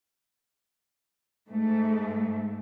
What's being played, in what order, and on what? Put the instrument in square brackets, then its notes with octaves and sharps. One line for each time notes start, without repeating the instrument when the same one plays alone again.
[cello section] G#2 A3